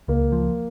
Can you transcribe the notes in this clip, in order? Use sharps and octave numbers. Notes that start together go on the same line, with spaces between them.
C#2 A#3
F3